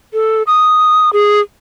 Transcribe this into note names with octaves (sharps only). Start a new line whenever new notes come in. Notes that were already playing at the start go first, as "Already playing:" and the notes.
A4
D#6
G#4